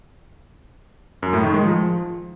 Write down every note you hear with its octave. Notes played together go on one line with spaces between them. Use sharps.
F#2
A2
D#3
G#3
F3